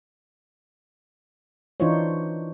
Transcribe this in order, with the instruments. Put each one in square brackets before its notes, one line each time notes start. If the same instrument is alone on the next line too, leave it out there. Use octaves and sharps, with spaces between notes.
[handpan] E3 D4 D#4 F4 C5 C#5